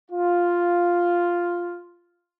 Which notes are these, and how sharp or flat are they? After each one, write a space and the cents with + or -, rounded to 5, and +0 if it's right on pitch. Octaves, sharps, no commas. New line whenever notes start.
F4 +0